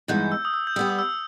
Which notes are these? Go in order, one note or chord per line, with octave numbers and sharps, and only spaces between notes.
G2 E3 G#3 B3 D#4 G6
E6
D#6
E6
G6
G3 B3 G4 E6
D#6
E6